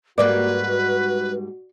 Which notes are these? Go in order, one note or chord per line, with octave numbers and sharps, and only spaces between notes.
G#2 G3 A#3 F#4 B4 D5